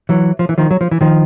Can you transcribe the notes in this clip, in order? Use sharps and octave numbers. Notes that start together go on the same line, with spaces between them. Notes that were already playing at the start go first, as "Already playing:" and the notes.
E3 F#3
F3
E3
D#3 F3
F#3
F3
E3
D#3 F3